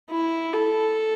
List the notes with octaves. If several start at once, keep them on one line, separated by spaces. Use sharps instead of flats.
E4
A4